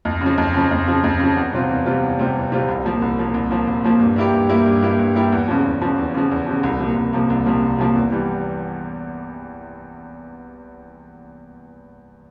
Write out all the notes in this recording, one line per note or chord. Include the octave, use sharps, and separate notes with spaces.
F2
C#3
F3
F2
C#3 F3
F2
C#3 F3
F2
C#3 F3
E2
C3 G3 C4 F4
E2
C3 G3 C4 F4
E2
C3 G3 C4 F4
E2
C3 G3 C4 F4
C2
A#2 F3 A#3
C2
A#2 F3 A#3
C2
A#2 F3 A#3
C2
A#2 F3 A#3
G2
G3 A#3 E4 G4
G2
G3 A#3 E4 G4
G2
G3 A#3 E4 G4
G2
G3 A#3 E4 G4
E2
C#3 F3
E2
C#3 F3
E2
C#3 F3
E2
C#3 F3
C2
C3 F3 A#3
C2
C3 F3 A#3
C2
C3 F3 A#3
C2
C3 F3 A#3
E2
E3 G3